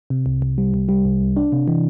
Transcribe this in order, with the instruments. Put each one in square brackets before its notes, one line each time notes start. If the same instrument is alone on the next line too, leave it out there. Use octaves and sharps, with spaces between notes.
[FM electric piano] C3
C2
C2
G3
C2
G3
C2
C2
D4
C3
E3